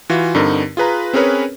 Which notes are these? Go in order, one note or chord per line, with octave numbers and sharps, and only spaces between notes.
E3 F4 F#4
G2 D3 C4 D#4 A#4
F4 G#4 B4 A#5
C4 C#4 G#4 A#4 B4 C#5